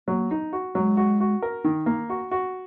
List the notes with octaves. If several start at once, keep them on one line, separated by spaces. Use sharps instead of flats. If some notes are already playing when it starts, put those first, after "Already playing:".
F#3 A#3
D#4
F#4
F#3 G#3
F#4
F#4
A#4
D#3
A#3
F#4
F#4